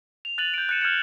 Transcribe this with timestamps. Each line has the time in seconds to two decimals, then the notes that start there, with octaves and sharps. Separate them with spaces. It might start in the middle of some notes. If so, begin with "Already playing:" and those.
0.25 F7
0.38 F#6 A6 D#7 F7 F#7
0.54 G6 D7
0.69 F#6 G6 A6 C#7 D#7 E7
0.81 F6 G6 G#6 C#7 E7